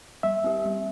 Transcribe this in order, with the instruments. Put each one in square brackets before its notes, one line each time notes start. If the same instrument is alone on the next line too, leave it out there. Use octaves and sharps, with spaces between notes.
[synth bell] G3 [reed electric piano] E5
[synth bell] C4 G4
G3